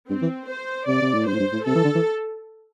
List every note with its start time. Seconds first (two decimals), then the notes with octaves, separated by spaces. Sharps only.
0.09 G2 C4
0.22 E3
0.49 C5
0.87 C3 D5
1.02 C3
1.14 A2
1.27 G2 C5
1.33 A2
1.40 G2
1.53 A2
1.65 C3 A4
1.75 E3
1.85 D3
1.95 E3